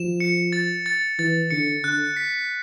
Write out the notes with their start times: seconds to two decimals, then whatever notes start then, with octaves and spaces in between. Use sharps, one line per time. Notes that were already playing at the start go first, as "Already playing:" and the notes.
Already playing: F3 E7
0.20 C#7
0.53 A6
0.86 A6
1.19 E3 A6
1.51 D3 C#7
1.84 D3 F#6
2.16 B6